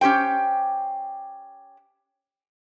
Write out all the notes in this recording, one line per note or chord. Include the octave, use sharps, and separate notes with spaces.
C#4 G4 C5 G5